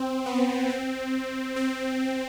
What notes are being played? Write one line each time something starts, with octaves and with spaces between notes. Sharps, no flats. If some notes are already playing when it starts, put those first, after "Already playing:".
Already playing: C4
B3
C4
C4